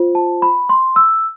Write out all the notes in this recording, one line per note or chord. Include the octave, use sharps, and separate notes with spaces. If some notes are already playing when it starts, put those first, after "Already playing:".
Already playing: F4 C5
A5
B5
C6
E6